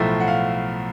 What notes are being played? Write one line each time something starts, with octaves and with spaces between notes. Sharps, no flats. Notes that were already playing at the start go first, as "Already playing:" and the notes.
Already playing: B1 A2 F3 A3 E5
F#5
F5